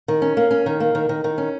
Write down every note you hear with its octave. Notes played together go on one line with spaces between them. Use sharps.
D#3
C#4
A#3
C#4
D#3
A#3
D#3
D#3
D#3
C#4